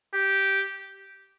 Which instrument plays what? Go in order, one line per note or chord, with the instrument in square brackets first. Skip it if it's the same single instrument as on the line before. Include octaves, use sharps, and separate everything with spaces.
[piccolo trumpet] G4